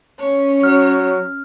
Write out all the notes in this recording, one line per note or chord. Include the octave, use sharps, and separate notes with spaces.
C#4 C#5
F#3 F6